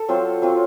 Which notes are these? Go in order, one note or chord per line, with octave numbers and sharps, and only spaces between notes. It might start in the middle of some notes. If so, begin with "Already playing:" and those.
Already playing: A4
F#3 C4 F4 C5
F#3 C4 F4